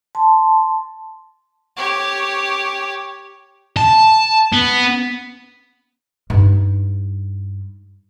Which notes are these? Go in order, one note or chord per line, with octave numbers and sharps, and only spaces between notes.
A5 C6
G4 C#5
A5
B3
G2 D#4